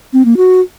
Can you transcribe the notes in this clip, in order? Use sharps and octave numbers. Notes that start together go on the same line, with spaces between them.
C4
A#3
F#4